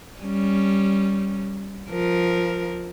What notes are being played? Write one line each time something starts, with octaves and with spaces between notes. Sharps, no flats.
G3 C#4
F3 A#4